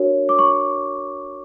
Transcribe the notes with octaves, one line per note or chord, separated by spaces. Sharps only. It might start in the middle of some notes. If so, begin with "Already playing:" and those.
Already playing: D4 F#4 A#4 C#5
D6
C#6